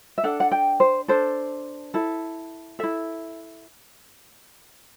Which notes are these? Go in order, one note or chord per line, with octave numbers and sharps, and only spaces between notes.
E5
D4 A4 F#5
F#5
G5
C5
D4 A4 C5
E4 A4
E4 A4 E5